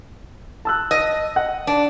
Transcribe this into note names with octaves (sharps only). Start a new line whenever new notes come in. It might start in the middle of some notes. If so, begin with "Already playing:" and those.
A5 E6 F#6
D#5
F#5
D4